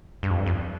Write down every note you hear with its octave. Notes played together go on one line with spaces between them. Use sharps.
G2
F2
G2
F2